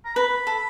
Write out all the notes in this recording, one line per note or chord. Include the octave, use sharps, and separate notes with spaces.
A#5
B4 B5
A4